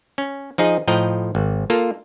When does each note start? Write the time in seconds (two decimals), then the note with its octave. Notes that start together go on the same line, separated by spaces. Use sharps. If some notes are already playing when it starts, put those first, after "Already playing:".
0.18 C#4
0.58 F3 D#4 G#4 D#5
0.88 A2 F3 D#5 G5 A#5
1.35 G#1
1.70 A#3 F4 A4